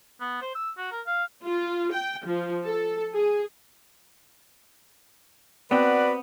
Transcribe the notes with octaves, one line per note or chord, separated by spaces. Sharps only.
B3
C5
E6
F#4
A#4
F5
F4
G5
F3
A4
G#4
B3 C4 F#4 B4 D5